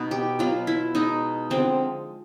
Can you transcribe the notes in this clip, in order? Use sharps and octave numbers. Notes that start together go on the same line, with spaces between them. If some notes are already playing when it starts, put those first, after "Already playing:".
Already playing: B2 B3 D#4
G4
B2 F#3 B3 F4
E4
B2 G#3 B3 D#4
D3 F3 G#3 C4